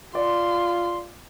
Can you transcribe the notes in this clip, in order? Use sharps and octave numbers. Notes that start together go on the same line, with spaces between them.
F4 D5 C6